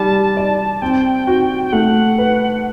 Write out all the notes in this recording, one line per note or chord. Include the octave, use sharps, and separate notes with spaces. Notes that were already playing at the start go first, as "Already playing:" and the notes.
Already playing: G3 A5
D5
C4 G5
F#4
G5
A3 F#5
B4